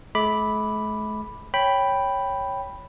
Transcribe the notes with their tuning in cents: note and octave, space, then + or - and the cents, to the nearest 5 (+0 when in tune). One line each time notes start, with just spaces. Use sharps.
A3 -45 B5 +0 D6 +0
C#5 -5 G5 +0 B5 +0